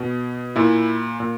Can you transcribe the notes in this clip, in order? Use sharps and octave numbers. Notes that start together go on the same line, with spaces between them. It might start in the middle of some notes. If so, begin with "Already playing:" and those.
Already playing: B2
A#2 E4
A#2